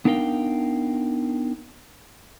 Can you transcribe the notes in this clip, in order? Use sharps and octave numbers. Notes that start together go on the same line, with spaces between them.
B3 D4 D#4 A#4 F5 G5